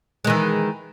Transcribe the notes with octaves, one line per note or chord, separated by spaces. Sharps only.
D#3 E3 G#3